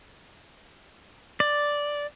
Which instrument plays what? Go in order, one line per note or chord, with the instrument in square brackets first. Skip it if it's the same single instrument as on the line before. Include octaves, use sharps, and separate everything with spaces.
[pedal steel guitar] D5